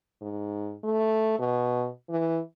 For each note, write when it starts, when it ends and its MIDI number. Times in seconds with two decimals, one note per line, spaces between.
0.22 0.75 44
0.84 1.36 57
1.39 1.88 47
2.10 2.40 52